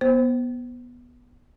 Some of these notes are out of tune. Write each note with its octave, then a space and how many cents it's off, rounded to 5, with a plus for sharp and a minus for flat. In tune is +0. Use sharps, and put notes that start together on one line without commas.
B3 -10 C5 +0